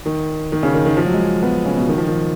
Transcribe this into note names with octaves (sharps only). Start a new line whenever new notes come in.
D#3
D#3
C#3
D#3
D#3
F3
F#3
G#3
B3
C#3
B2
D#3
F3
D#3